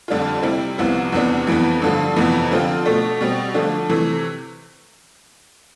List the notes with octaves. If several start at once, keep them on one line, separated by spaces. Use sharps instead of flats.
F2 D3 G3 D4 F4
C3 G3 C4 E4
C2 C3 F3 B3 E4
E2 C3 E3 B3 D4
F2 E3 B3
G2 D3 F3
F2 C3 E3 B3
D3 F3 C4 F4
B2 A3 D4
B2 G3 C4
D3 F3 A3 D4
C3 E3 A3